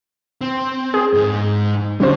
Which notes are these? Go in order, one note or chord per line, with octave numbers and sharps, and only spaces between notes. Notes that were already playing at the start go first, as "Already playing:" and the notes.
C4
G#4
G#2 D#4
D3 G3 C#4 C5